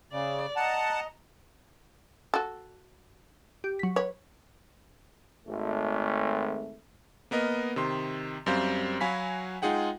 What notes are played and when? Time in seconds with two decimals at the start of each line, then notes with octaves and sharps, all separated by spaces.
0.12 C#3 D5
0.56 D#5 F#5 A5 A#5
2.34 F#4 A4
3.64 G4
3.79 F#3 B6
3.96 B4 C#5
5.48 G#1 A3
7.31 A#3 B3 A#4 D#5
7.76 C3 D#3 C6
8.46 F#2 G3 C4 C5 F5
9.00 F#3 F#4 F5 G#5 B5 B6
9.62 G#3 D#4 F4 G#4 F#5 G5